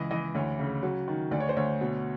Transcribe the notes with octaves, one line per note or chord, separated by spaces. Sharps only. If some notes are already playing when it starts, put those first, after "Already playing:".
Already playing: C#2 E3 D#5
E3 D#5
D2 C#5
C#3
F#3
D#3
D2 D5
C#5
C5
D2 C#5
B2